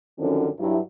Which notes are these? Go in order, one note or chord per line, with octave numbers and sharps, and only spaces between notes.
F#2 D3 D#3 F3 C4 C#4
G2 F#3 E4